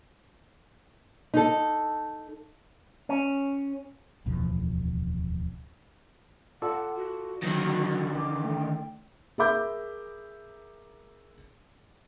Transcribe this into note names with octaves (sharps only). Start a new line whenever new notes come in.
D#4 A4
C#4
D1 E2 B2 F3
F4 A4 D5 F#5
F#4
D3 D#3 F#3 A#6
D6
A3 G5
G#4 A#4 E5 B5 D6 G6